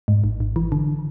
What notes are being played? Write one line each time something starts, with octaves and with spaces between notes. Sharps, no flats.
G#2
G#1
G#1
E3
D3